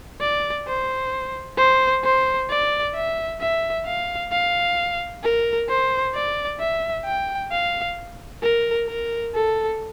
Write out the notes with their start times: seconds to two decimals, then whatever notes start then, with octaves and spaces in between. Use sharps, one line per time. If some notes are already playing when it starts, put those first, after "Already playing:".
0.20 D5
0.67 C5
1.58 C5
2.04 C5
2.50 D5
2.94 E5
3.41 E5
3.86 F5
4.32 F5
5.23 A#4
5.69 C5
6.15 D5
6.60 E5
7.05 G5
7.52 F5
8.42 A#4
8.88 A#4
9.35 A4